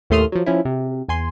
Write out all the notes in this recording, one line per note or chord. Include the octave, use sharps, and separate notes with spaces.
D#2 A2 A3 C6 D#6 F6
F3 F#3
F3 C#4 E4
C3
E2 G#5 C6